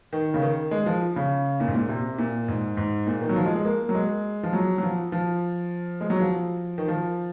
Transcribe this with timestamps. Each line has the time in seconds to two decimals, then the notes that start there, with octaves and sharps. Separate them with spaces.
0.13 D#3
0.34 C#3
0.42 D#3
0.71 G#3
0.86 F3
1.16 C#3
1.60 A#2
1.68 G#2
1.75 A#2
1.89 C3
2.18 A#2
2.48 G#2
2.77 G#2
3.06 A#2
3.21 D#3
3.29 F#3
3.36 F3
3.46 G#3
3.56 G#3
3.65 A#3
3.89 F#3
3.95 G#3
4.43 F3
4.53 F#3
4.78 F#3
4.83 F3
5.12 F3
6.01 G#3
6.10 F#3
6.20 F3
6.78 D#3
6.88 F3